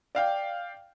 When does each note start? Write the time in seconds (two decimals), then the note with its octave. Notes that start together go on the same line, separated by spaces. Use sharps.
0.15 D5 F5 G5